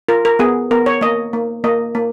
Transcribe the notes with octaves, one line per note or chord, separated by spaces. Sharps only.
F4 A#4
A#4
B3 G#4
B3 A#4
C#5
A#3 D#5
A#3
A#3 D#5
A#3